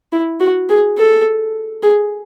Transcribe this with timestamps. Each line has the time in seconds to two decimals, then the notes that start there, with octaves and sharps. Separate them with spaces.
0.12 E4
0.40 F#4
0.69 G#4
0.97 A4
1.83 G#4